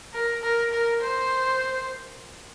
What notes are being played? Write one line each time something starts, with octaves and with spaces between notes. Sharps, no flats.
A#4
A#4
A#4
C5